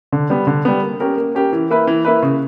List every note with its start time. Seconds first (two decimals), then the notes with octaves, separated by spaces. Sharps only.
0.12 D3
0.30 G3 B3
0.47 D3
0.65 G3 B3
0.82 A#3
1.00 C#4 G4 A#4
1.18 A#3
1.35 C#4 G4 A#4
1.53 E3
1.70 A#3 E4 B4
1.87 E3
2.05 A#3 E4 B4
2.22 C#3